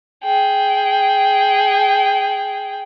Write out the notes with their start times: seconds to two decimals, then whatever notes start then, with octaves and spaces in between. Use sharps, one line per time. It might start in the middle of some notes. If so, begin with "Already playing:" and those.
0.24 G#4 G5